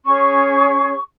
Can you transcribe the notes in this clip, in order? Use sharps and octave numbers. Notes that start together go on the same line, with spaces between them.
C#4 G#4 C#5 C#6